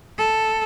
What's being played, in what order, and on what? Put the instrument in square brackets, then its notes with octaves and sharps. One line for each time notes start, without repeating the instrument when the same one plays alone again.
[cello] A4